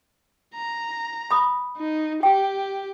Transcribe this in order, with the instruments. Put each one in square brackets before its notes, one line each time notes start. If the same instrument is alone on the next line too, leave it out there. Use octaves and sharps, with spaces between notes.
[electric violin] A#5
[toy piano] B5 D#6
[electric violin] D#4
[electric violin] G4 [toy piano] G5